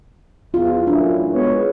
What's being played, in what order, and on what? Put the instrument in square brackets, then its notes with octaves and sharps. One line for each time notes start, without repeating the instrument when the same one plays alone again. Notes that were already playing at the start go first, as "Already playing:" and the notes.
[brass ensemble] E2 [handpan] F4
[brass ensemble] F#2 A2 E3 [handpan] D4
[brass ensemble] G#3 B3 C#5